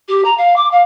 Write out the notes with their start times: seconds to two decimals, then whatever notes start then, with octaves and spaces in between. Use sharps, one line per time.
0.08 G4
0.25 A#5
0.38 F5
0.56 D6
0.71 F5